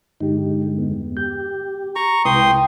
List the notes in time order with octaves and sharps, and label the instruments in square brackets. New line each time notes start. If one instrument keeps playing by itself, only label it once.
[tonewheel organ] G2 D3 G#3 [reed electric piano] D#4 G4
[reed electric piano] E2 B3
[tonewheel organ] G4 [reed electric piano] G6
[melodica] A#5 C#6
[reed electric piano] C2 C3 [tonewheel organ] G#3 E4 B4 [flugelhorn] G5 [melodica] C6 D#6